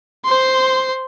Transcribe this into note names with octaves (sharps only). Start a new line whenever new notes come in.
C5 C6